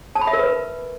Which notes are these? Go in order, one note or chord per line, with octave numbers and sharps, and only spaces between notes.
A5
B5
E5
A#4
B4